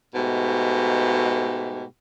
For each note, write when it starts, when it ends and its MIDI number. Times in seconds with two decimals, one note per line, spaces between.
0.15 1.85 44
0.15 1.85 47
0.15 1.85 57
0.15 1.85 67